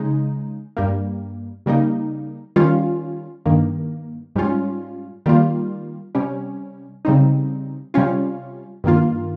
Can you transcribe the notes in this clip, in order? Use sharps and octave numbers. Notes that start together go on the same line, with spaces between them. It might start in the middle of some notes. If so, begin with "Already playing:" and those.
Already playing: C#3 G#3 D#4
G2 G3 A#3
C#3 G3 A#3 D#4
D#3 G3 C#4 F4
G2 D#3 A#3
G#2 G3 C#4 F4
D#3 G3 A#3 F4
C3 G3 C#4
C#3 G3 C4 D#4
C3 G3 C#4 F4
G2 D#3 A#3 F4